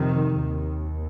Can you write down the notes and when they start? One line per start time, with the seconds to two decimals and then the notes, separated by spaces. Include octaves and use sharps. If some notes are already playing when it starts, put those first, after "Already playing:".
Already playing: F2 C3 D#3
0.46 D#2